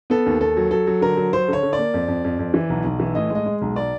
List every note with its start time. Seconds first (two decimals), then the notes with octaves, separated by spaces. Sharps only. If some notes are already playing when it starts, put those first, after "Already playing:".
0.10 B3 A4
0.26 D#2
0.41 D#2 A4
0.57 F#3
0.71 F#3 A4
0.87 F#3
1.01 D3 A#4
1.17 F#3
1.33 F#3 C5
1.48 D3 C#5
1.63 D3
1.73 D5
1.78 A#3
1.94 F2
2.08 F2
2.25 F2
2.39 F2
2.54 E3
2.70 B1
2.85 B1
3.00 E3
3.15 A2 D#5
3.30 G#3 D#5
3.46 G#3
3.62 B1
3.76 D5